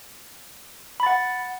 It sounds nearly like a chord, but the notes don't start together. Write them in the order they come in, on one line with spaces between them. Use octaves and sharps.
B5 A6 F#5